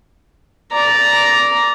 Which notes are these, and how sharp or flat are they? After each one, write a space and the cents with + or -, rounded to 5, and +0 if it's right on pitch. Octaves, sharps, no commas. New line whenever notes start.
D5 -10 A#5 +5